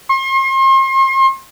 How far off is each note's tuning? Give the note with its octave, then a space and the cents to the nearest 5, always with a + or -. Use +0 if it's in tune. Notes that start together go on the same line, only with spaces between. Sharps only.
C6 +40